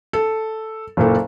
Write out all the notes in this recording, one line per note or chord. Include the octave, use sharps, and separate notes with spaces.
A4
F#1 A#2 A4